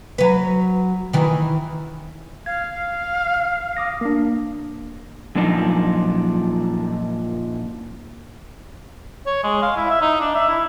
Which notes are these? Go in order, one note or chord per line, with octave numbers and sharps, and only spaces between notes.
F#3 B4
D#3 E3
F5 G#6
D6 D#6 A#6
A#3 D4
F#2 A#2 F3 D4 D#4
C#5
G#3
F5
E4
E5
D#4
D4
E5
E4